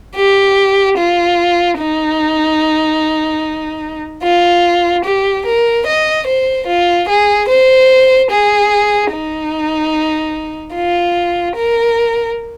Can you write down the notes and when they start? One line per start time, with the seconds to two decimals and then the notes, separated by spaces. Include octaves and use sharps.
0.16 G4
0.98 F4
1.79 D#4
4.23 F4
5.05 G4
5.46 A#4
5.87 D#5
6.28 C5
6.67 F4
7.09 G#4
7.49 C5
8.31 G#4
9.12 D#4
10.75 F4
11.56 A#4